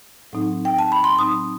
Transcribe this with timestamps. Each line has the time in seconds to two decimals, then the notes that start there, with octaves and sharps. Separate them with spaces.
0.33 A2 F#3 C4 D#4
0.65 G5
0.79 A5
0.92 B5
1.04 C6
1.18 A2 F#3 C4 D#4 D#6